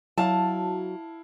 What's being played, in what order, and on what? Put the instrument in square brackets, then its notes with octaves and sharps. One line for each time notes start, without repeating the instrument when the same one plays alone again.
[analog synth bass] F#3 [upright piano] E4 F5 [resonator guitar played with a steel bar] A5